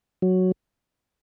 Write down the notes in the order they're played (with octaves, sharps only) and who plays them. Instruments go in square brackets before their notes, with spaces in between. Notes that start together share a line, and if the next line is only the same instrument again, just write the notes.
[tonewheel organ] F#3